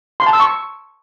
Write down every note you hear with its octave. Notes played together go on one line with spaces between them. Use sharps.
C6
A5
E6
C#6